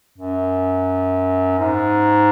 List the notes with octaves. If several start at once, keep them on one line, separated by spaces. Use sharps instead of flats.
F#2
G#2